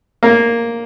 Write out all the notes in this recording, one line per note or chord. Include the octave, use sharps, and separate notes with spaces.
A#3